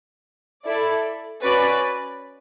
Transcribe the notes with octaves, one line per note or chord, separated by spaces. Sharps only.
E4 A4 D5
C#4 F#4 B4 D5